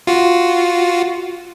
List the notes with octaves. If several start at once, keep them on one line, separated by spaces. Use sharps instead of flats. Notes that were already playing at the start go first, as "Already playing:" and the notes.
F4 F#4